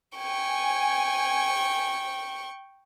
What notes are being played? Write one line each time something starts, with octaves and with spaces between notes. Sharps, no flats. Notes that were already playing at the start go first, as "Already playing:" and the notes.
G5 G#5 C#6